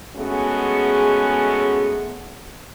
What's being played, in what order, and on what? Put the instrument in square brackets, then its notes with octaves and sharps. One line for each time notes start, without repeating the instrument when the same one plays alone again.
[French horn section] G#3 A3 B3 C#4 F#4 G#4